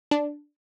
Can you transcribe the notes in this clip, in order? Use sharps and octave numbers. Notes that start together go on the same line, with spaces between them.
D4